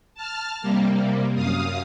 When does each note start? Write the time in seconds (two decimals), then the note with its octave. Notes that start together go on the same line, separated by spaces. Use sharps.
0.15 A5 F6
0.62 C3 G3 A#3
1.35 F#2 F5 D#6